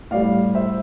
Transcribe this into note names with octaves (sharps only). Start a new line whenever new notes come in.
A2 G3 D5 F5
C5 E5